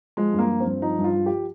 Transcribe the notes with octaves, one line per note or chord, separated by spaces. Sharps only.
F3 G#3
G2
A#3
F3
C4
G2
F3 D#4
G2
F4
F3
G4